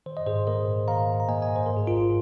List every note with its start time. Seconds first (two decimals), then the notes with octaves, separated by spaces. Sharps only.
0.06 D#3 C5
0.17 D#5
0.26 G#2 G#4 C5
0.47 A#3 A#4 D#5
0.67 G#2
0.88 D#3 F5 A#5
1.08 G#2
1.20 A#5
1.29 A#3 D#5 G#5
1.42 D#5 G#5
1.49 G#2
1.56 C5
1.66 G#2 A#4
1.77 G#4
1.87 G#1 F4 A#4